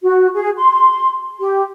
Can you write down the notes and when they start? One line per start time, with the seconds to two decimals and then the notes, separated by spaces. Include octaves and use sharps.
0.01 F#4
0.34 G#4
0.57 C6
1.39 G4